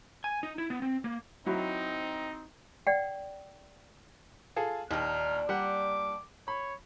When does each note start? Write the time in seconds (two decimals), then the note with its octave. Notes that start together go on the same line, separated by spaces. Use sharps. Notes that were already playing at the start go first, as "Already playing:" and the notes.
0.24 G#5
0.43 D#4
0.58 E4
0.70 B3
0.82 C4
1.04 A#3
1.46 F#3 C4 D#4 E4
2.87 D5 F#5 G5
4.56 F4 G#4 A4
4.91 D#2 A#2 D4 D#4 F6
5.49 G3 F#5 D6
6.48 C#5 B5